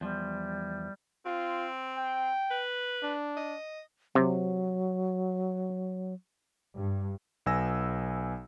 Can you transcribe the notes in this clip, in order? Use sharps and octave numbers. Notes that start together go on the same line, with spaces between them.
E2 F3 G3
C4 F4
G5
B4
D4
D#5
C3 F#3
G2
B1 B3 G#5 E6 A#6